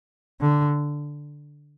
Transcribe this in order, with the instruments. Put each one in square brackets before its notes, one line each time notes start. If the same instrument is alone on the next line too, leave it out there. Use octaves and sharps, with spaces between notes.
[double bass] D3